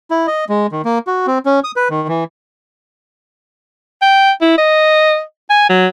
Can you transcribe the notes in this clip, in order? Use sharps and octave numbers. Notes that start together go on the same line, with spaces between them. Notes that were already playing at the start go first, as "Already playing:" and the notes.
E4
D#5
G#3
D#3
A#3
F#4
C4
C#4
D#6
B4
D#3
E3
G5
E4
D#5
G#5
F#3